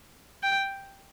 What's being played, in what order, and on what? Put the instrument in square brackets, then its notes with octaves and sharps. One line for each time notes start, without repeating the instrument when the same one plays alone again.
[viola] G5